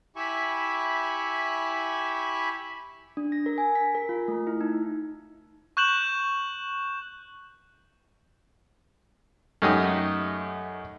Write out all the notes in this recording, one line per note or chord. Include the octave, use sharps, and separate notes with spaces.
E4 G4 E5 G#5 B5 C#6
D4
A#6
A#4
G#5
B6
A#4
F4
A3
E4
D#4
C#6 F#6 G6 E7 F#7
F#2 A3 D#4 G4 F#5 D#6